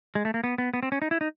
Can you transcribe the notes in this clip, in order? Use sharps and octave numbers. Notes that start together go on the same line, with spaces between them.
G#3
A3
A#3
B3
B3
B3
C4
C#4
D#4
E4
D#4